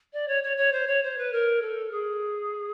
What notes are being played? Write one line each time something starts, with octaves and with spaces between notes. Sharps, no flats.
D5
C#5
C#5
C#5
C5
C#5
C5
B4
A#4
A4
G#4